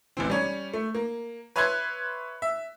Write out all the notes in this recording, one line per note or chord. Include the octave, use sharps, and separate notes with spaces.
A1 E3 C4
G3 C#4 C#5
A3
A#3
B4 C#5 E5 C6 F#6 G#6
E5